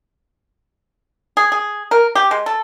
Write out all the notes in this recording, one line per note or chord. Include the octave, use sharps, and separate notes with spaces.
G#4
G#4
A#4
G4
G#3
A4